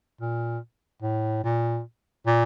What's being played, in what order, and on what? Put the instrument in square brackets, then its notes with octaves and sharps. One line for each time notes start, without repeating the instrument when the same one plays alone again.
[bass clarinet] A#2
A2
A#2
A#2